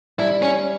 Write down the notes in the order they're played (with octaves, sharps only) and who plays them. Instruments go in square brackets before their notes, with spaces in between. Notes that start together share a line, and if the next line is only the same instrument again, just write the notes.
[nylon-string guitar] G3 [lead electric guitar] E4
[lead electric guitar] C#4